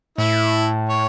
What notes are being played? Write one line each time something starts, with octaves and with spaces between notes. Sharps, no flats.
A2 E4
C#5